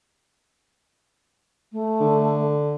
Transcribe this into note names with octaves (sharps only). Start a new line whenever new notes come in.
A3
D3